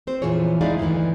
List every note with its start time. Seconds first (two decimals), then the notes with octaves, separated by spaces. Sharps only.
0.07 C4 C5
0.22 F2 A#2 E3 F4 G#4 C#5
0.61 G#3 D#4 E4 G#4 D5 F5
0.79 D2 G2 B2 D#3 E3